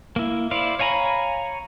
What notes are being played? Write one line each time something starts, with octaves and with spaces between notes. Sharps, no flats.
A#3 E4
E4 C5 D5 F5
C#5 F5 G#5 A#5 B5